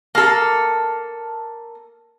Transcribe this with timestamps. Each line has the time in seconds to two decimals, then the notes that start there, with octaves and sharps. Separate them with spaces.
0.15 A#3 A4